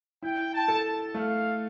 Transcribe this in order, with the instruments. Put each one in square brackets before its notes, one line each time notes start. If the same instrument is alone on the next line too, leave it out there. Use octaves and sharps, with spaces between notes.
[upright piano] E4 [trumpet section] G5
[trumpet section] A5
[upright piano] A4
[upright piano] A3 [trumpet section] F5